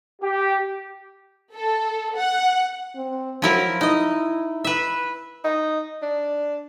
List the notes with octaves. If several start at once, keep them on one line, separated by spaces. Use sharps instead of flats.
G4
A4
F#5
C4
F3 F#3 E4 A#4
D#4 E4 D#5
B4 E5
D#4
D4